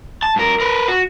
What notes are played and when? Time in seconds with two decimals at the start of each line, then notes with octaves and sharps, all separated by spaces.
0.23 A5
0.36 G2 A#4
0.60 A#4 B4
0.88 F#4